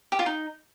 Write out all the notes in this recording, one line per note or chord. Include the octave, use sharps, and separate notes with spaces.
G4
F4
D#4